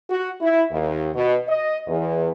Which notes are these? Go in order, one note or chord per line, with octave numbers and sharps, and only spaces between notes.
F#4
E4
D#2
B2
D#5
E2